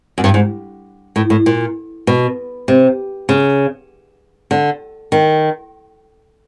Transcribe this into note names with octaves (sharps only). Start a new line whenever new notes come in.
F#2
G2
G#2
A2
A2
A#2
B2
C3
C#3
D3
D#3